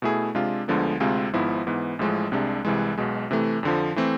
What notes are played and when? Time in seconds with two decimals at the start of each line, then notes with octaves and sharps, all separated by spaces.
0.02 B2 A3 E4 G#4
0.35 C3 G#3 D4 F4
0.68 D2 D3 F3 G#3 B3
1.00 D2 C3 G#3 C4 F4
1.33 G#1 G#2 F3 B3 E4
1.67 G#2 E3 B3
1.99 A1 A2 F3 G#3
2.32 C2 C3 G#3 D4
2.65 C2 C3 E3 G#3
2.98 B1 B2 G#3
3.31 C3 E3 A3
3.63 F2 D3 F3
3.96 E3 A3 C4